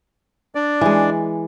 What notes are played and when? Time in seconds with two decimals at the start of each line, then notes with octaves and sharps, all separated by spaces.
0.55 D4 D5
0.81 E3 G#3